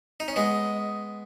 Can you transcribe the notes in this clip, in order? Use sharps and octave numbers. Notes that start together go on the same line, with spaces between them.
D#4
C#4
G#3 B3 D#5